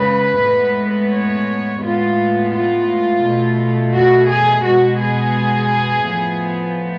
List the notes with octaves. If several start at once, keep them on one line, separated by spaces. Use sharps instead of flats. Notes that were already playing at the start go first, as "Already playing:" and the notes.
Already playing: C#3 G#3 B3 B4
A2 G#3 B3
C#5
A2 G#3 B3 F4
F4
B2 A3
F#4
G#4
B2 G#3 B3 F#4
G#4
A2 F3 B3